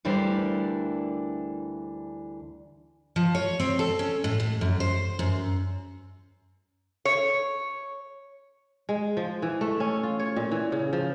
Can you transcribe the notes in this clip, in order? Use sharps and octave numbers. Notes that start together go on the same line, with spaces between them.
D2 E3 G3 D4 A#4 C5
F3
C#5
C4
A4
C#4
A2
A2
F#2
C5
F#2
C#5
G#3
F3
E3
A3
C#4
F4
C#5
A#2
E3
C#3
F3